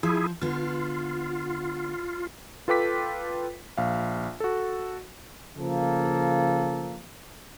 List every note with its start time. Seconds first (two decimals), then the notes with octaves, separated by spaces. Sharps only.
0.03 F3 E4 G#4
0.41 D3 B3 F4
2.68 F4 A4 B4 G5 D6 B6
3.77 A#1 F5
4.40 F#4 A4
5.56 C#3 F3 A#3 A4